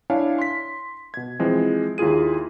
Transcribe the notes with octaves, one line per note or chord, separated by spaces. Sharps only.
D4 E4 C#5 F5 G#5
C6 B6
B2 G#6
E3 F3 G#3 C4
D#2 E4 F4 G#4 D#7